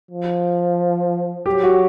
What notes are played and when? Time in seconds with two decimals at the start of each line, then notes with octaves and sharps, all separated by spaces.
0.11 F3
1.46 F#3 G4
1.63 F#4